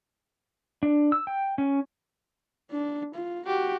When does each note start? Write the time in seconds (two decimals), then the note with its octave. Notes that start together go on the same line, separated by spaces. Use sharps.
0.83 D4
1.12 E6
1.27 G5
1.58 C#4
2.71 D4
3.15 F4
3.47 F#4 G4